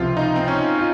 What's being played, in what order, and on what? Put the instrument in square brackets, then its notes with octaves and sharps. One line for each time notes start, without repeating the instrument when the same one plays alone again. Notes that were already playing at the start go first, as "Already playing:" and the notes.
Already playing: [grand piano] C#2 C3 F3 [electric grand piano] F4
[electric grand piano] D#4
C4
C#4
[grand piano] F4